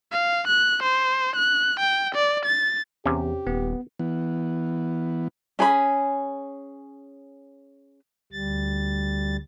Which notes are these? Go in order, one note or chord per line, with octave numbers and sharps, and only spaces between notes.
F5
F#6
C5
F#6
G5
D5
A6
E2 C3 C#4 G4
D#1 B3
E3 B3
C#4 G#4 D#5 B5
D2 G3 A6